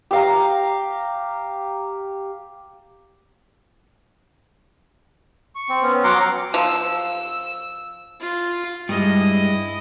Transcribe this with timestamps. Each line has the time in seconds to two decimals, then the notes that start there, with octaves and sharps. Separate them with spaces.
0.11 G4 F5 A#5
5.55 C#6
5.69 C4
5.82 B3 C#4
6.04 F#3 F#5 A#5 C6 D6
6.54 F3 E6
8.20 F4
8.89 G2 G#3 E4 D#5